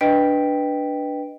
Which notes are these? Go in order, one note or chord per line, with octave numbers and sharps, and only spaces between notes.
D4 B4 D#5 G5 B6 D7